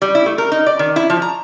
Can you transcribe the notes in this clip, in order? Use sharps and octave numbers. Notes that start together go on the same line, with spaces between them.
G3
E4
A3
A#4
D#4
D5
D#3
E4
F3
A#5